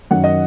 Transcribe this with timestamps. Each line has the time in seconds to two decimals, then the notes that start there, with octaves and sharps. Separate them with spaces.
0.11 F#2 D#3 F#3 F#5
0.24 D#5